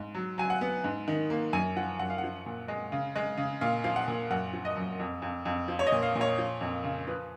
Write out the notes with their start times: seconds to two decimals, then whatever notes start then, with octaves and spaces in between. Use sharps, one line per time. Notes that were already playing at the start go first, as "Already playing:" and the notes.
Already playing: G#2
0.15 F#3
0.38 F#3 G#5
0.50 F#5
0.61 B3
0.84 G#2
1.08 D#3
1.30 A#3
1.53 F#2 G#5
1.76 F3 F#5
1.99 F#2 F#5
2.10 F5
2.18 F#5
2.23 F3
2.46 A#2
2.68 G#3
2.92 C#3
3.16 G#3
3.37 C#3
3.61 A#2 F5
3.84 F3 F5
3.96 F#5
4.08 A#2
4.30 F#2 F#5
4.53 F3
4.65 D#5
4.77 F#2
5.00 F2
5.22 F2
5.45 F2
5.68 F3
5.79 C#5
5.86 D#5
5.92 A#2
6.03 F5
6.15 A#2
6.21 C#5
6.38 F3
6.61 F2
6.84 C#3
7.07 F3 B4